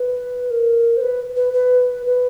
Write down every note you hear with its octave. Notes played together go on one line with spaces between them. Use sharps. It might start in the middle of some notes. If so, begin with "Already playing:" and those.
Already playing: B4
A#4
C5
B4
B4
B4
B4